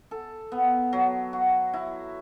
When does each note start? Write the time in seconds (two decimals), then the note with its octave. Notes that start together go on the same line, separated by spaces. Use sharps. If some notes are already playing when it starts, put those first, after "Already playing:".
0.11 A4
0.52 B3
0.93 F#3
1.33 F#4
1.73 E4